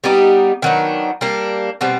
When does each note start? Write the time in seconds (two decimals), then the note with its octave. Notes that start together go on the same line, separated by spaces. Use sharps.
0.04 G3 B3 D#4 G4
0.62 D#3 F#3 B3 D4
1.21 G3 A#3 D4
1.81 B2 G3 C4